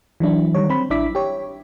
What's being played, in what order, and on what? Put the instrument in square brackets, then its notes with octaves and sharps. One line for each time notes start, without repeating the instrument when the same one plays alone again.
[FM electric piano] E3 F#3 D4 E4
D#3 G3 C#5
C4 C5 B5
A1 D4 E4 E5 D6 B6
G4 C#5